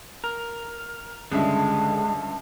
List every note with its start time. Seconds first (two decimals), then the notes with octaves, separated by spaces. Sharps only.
0.24 A#4
1.31 C#2 G2 D3 G#3 E5 A5